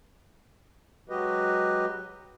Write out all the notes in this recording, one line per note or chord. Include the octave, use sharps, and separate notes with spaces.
F#3 G#3 F#4 G4 B4 D#5